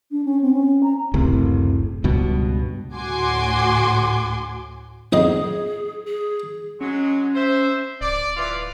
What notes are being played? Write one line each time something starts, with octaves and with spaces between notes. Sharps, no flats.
D4
C#4
C4
C#4
A#5
F#1 D2 A2 C3
C#2 G2 B2
D2 A2 F#4 G#5 C6 D6
B1 F2 G#4 D#5
G#4
F#3 G#3 C#4
C5 E5
D1 D5
E3 F4 D5